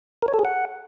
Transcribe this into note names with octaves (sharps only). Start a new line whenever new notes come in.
A#4
C#5
A4
G#4
F#5